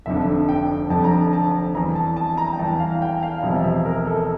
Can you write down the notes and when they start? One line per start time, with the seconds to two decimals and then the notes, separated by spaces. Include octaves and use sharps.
0.06 F1 F2 D3 E5
0.49 G5
0.90 F1 F2 D3 A5
1.04 A#5
1.17 A5
1.33 A5
1.74 E2 E3 A#5
1.95 A5
2.17 A5
2.37 A#5
2.53 G5
2.59 E2 E3 A5
2.80 F5
3.02 G5
3.23 F5
3.43 E1 E2 C3 F3
3.64 E5
3.86 A#4
4.07 A4